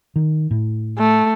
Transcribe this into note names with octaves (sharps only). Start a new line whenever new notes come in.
D#3
A2
A3